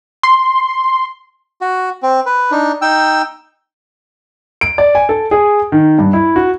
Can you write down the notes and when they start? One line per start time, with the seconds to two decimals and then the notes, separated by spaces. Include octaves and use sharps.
0.23 C6
1.61 F#4
2.03 C4
2.26 B4
2.51 D4 D#4
2.82 D#4 G5 E6
4.61 D7
4.78 D5
4.95 G#5
5.09 A4
5.31 G#4
5.72 D#3
5.99 G2
6.13 E4
6.36 F#4